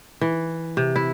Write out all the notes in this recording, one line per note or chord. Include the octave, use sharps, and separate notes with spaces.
E3
C3
E4